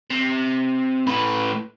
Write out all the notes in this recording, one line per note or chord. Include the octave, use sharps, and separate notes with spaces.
C3
A2 B4